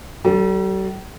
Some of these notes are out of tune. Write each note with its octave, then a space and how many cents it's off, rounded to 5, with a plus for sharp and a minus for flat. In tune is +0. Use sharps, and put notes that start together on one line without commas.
G3 -45 A4 +0